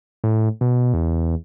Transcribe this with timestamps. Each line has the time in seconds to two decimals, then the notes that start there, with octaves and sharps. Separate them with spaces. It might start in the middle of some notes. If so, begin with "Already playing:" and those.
0.24 A2
0.61 B2
0.94 E2